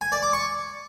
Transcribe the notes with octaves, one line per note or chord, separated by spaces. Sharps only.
G#5
D5
D6
C#6